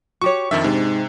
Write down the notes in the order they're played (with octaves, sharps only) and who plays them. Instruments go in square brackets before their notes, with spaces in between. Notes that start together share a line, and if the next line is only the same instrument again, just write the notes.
[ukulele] F#4 G4 C#5 [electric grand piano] C#6
[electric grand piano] F2 D#3 E5 [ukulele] D4
[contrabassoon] G#2 [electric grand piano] C3